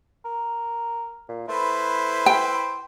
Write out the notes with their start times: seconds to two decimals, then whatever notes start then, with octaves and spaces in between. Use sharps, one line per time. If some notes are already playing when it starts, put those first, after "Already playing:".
0.25 A#4
1.29 A#2
1.48 A3 E4 B4 C5
2.26 G5